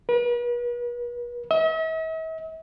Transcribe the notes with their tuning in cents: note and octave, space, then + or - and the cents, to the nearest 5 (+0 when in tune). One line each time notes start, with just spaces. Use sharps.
B4 -40
E5 -45